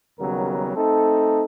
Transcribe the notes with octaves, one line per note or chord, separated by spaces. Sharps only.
D#2 C#3 F#3 G3 B3 A#4
A3 C4 D#4 A4